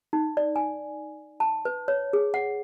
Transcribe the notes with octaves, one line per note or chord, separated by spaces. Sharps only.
D#4
D5
G#5
A5
B4
C#5
G#4
F#5